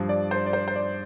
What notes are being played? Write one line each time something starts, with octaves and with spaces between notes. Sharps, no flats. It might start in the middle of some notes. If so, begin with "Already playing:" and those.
Already playing: G2 F3
D5
C5
D5
C5
C5
D5